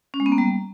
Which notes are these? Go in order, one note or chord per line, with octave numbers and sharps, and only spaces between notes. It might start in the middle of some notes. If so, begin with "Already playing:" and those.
C#4
G#3
B3
A#3
G3